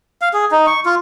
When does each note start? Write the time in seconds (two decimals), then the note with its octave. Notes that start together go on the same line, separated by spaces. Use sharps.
0.21 F5
0.33 G#4
0.51 D#4
0.67 C#6
0.85 F4